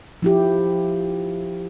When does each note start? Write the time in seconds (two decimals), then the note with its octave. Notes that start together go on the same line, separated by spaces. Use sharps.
0.22 F3 E4 G4